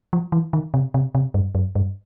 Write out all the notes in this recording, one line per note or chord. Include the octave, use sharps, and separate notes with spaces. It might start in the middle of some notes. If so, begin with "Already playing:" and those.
F3
E3
D#3
C3
C3
C3
G2
F#2
G2